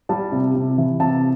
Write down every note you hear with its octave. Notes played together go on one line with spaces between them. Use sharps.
G3 A5
C3
C3
E3
C3 A5